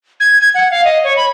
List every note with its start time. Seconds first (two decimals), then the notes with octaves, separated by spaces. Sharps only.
0.20 G#6
0.41 G#6
0.55 F#5
0.71 F5
0.85 D#5
1.04 C#5
1.17 B5